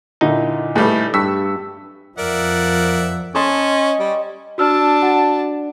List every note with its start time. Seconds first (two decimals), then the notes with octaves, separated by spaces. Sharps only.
0.21 A#2 D3 D#4 E4
0.76 A2 G3 A3 G#4 B4
1.14 G2 C#6 E6 B6
2.18 F2 F3 A#4 D5 E5 F#5
3.35 C#4 D#5 A5 C6
4.00 G3
4.58 D4 F#4 A5 E6 F6
5.02 F#4 F#5